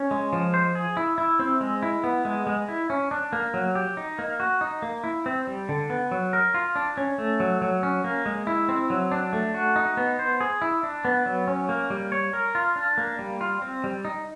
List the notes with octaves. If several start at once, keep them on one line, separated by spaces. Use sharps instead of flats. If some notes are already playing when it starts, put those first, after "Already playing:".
Already playing: C#4
G#3
F3
C5
G#4
E4
E4
C4
G#3
E4
B3
G#3
G#3
E4
C#4
D4
A#3
F#3
G4
D#4
A#3
F#4
D#4
A#3
E4
C4
G3
D3
B3
F#3
A#4
F4
D4
C#4
A3
F#3
F#3
C#4
A#3
G#3
E4
C4
F#3
D4
A3
F#4
D#4
B3
C5
G#4
E4
D4
B3
F#3
C#4
A#3
G3
C#5
A#4
F4
D4
A#3
G3
F4
C4
G3
D#4